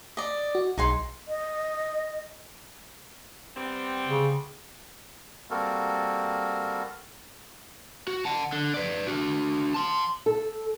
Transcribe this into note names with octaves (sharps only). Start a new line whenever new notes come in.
D5 D#5
F#4
B1 D#4 G#4 C6
D#5
G3 B3 C4
C#3
G3 A#3 C4 F#4 A4 A#4
F#4
F#5 A5
D3
B4 D5
D4 F#4
A5 C6
A4